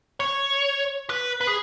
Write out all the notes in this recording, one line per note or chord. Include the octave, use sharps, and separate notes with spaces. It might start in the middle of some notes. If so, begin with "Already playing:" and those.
C#5
B4
B4
G#4